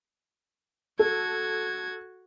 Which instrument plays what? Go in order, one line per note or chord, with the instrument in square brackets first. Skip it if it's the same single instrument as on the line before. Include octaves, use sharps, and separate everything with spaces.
[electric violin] F#4 G#6 [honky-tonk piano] A4